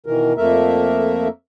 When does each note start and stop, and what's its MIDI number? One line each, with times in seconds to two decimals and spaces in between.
0.06 0.33 47
0.06 0.33 51
0.06 0.33 52
0.06 0.33 70
0.37 1.28 41
0.37 1.28 57
0.37 1.28 58
0.37 1.28 70
0.37 1.28 76